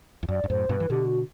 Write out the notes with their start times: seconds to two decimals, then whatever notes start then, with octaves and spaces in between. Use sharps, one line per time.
0.23 E2
0.29 F#2 D5
0.44 G2
0.49 F#2 A2 C5
0.69 G2 B2 B4
0.80 E3
0.90 B2 D3 G4
1.05 F#4